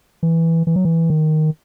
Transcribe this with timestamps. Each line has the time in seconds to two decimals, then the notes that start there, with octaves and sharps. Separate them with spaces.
0.23 E3
0.67 E3
0.76 F#3
0.85 E3
1.10 D#3